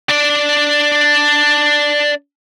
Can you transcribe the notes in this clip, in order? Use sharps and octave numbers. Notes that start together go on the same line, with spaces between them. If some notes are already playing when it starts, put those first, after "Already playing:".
D4 D5